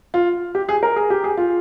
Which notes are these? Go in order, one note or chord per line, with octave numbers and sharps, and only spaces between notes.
F4
G4
G#4
A#4
G#4
G4
G#4
F4